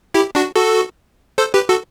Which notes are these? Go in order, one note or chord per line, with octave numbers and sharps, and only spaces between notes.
E4 G4
D4 F#4
F#4 A4
A4 C5
G4 B4
F#4 A4